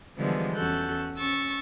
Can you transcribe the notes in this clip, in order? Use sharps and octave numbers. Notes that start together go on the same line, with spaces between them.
D3 E3 F3 G3 G#3 B3
E2 C#4 F#4 A4 F#6 G6
C#4 C#6 E6 A6